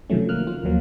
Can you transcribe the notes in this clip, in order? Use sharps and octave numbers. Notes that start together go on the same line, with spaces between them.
C3 D#3 F3 F#3 A3 C#4
A#3 F6 F#6
F4
D#2 F3 F#3 A#3